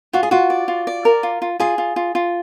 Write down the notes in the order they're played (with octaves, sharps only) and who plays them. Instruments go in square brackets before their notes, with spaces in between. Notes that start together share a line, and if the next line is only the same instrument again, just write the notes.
[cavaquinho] F4 [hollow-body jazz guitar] F#4
[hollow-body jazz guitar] G#4
[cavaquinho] F4 [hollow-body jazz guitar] F#4
[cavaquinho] D5
F4
D5
A#4
F4
F4
[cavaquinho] F4 [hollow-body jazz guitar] G#4
[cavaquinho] F4
F4
F4